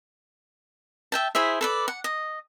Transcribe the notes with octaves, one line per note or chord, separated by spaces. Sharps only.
E5 G5 A5
E4 G#4 C5 E5
A4 B4 D5
F#5
D#5